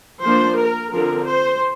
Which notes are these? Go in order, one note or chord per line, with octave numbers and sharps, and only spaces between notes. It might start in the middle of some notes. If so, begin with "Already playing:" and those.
F3 A#3 D4 C5
A#4
D3 F3 C4 A#4
C5